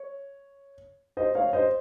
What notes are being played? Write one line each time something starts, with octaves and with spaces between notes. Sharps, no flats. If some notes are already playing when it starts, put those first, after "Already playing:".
Already playing: C#5
C5 D#5
C#5 F5
C5 D#5